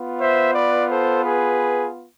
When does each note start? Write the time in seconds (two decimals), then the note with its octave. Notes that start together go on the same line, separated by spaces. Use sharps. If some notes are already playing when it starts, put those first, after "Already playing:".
Already playing: B3 F4
0.19 C5 E5
0.54 B4 D5
0.90 A4 C5
1.24 G#4 B4